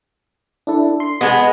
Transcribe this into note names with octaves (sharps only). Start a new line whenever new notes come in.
D4 E4 A4
C6
G#3 B3 D#5